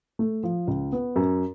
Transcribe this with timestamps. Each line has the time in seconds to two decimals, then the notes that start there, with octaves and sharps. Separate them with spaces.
0.19 A3
0.43 F3
0.68 C#2
0.93 B3
1.16 F#2